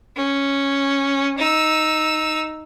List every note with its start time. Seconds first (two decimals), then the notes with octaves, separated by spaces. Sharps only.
0.16 C#4
1.38 D#4 E6